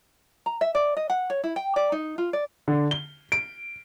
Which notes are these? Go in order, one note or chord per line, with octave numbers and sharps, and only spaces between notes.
A#5
E5
D5
D#5
F#5
C#5
E4
G5
D5
D#4
F4
D5
D3
G7
D7